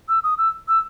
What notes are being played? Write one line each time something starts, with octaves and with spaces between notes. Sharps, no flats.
E6
D#6
E6
E6